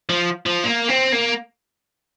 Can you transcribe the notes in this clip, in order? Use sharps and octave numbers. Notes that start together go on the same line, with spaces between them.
F3
F3
A#3
C4
A#3